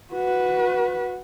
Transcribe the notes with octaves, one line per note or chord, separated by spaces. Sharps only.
F#4 B4